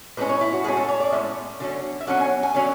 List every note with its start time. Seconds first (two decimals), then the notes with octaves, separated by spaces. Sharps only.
0.17 A2 G#3 C#4 B4
0.29 C#5
0.41 E4
0.53 F#4
0.64 A2 G#3 C#4 G#4
0.77 A4
0.88 C#5
1.00 D5
1.12 A2 G#3 C#4 E5
1.60 D3 F#3 C#4
2.01 E5
2.07 D3 F#3 C#4 F#5
2.20 G#5
2.43 G#5
2.54 D3 F#3 C#4